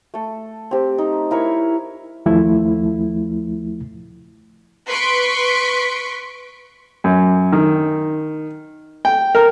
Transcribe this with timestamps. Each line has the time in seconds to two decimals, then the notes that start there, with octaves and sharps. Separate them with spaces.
0.14 A3 A4
0.71 C4 G4
0.98 D#4
1.31 E4 A#4 C#5 C#6
2.26 D#2 F3 A3 E4
4.88 B4 C6 C#6 B6 D7
7.04 F#2
7.53 D#3
9.05 G5
9.35 A#4